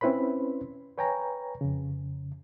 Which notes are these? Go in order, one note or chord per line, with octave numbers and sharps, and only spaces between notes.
C4 C#4 E4 B4 C5 B5
B4 C#5 G5 G#5 A#5
F2 C#3